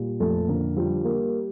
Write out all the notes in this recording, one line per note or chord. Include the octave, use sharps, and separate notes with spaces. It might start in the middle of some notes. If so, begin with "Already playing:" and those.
Already playing: A#2 G3
F2 A3 A4
D3 A#3 A#4
F3 G3 G4
A#3